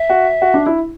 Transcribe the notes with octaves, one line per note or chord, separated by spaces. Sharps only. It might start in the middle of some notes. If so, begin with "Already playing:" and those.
Already playing: E5
F#4
F#4
D4
E4